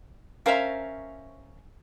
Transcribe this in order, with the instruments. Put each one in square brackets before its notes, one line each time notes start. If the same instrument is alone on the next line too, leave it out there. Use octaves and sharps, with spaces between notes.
[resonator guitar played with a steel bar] C#4 F5 A#5 [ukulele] A#4 C5 E5